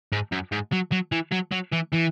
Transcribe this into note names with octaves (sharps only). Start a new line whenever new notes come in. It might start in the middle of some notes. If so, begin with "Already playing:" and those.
G#2
F#2
G#2
F#3
F#3
E3
F#3
F#3
E3
E3